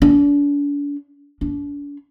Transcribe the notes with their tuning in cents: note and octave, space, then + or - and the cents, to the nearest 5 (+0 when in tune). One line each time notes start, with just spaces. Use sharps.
D4 -40
D4 -40